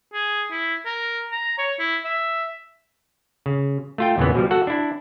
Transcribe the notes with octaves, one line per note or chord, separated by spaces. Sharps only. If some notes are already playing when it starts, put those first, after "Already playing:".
G#4
E4
A#4
A#5
C#5
E4
E5
C#3
A3 F4 G5
E2 A#2 C#3 E3 B3
B2 F3 G3
F#4 A4 F#5
D4 E4